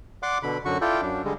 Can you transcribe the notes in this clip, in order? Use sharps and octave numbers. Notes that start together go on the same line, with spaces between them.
D5 F#5 C6 D6
B2 D3 B5
F#2 D3 F#4 C#6
E4 F4 A4 D5 G5
F#2 D4
D3 G3 G#3